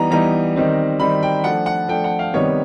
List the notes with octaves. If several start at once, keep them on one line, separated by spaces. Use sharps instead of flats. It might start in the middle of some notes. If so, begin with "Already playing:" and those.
Already playing: E3 G3 B3 D#4 A#5
E3 G3 B3 D#4 A#5
D#3 G3 C4 D#4
D#3 G3 C4 D#4 B5
G5
F3 A3 D4 F#5
F#5
F3 A3 D4 G5
F#5
F5
C3 D#3 G3 B3 D#4 C#5